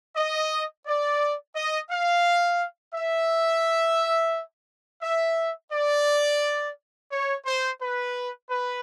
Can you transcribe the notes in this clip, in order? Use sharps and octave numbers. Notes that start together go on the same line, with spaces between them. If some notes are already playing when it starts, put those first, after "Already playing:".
D#5
D5
D#5
F5
E5
E5
D5
C#5
C5
B4
B4